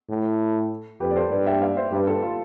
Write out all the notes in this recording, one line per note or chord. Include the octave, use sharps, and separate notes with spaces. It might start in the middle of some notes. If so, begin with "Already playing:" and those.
A2
F2 G4 B4
D5
A4 C5
G2 B4 D5
E5 G5
D5 F5
C5 E5
G2 G4 B4
F4 A4
F4